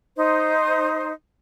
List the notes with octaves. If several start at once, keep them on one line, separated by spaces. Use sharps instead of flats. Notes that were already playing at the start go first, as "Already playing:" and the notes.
D#4 C5